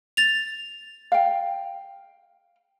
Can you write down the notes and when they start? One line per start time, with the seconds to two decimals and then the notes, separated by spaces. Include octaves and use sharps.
0.17 A6 F7
1.12 F5 G5